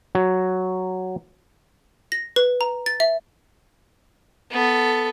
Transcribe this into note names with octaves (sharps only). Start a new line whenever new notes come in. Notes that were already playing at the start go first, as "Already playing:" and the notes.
F#3
A#6
B4
A#5
A6
E5
B3 A4